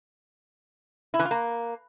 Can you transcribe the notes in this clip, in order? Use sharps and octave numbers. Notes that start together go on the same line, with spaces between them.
E4
E3
F4
A#3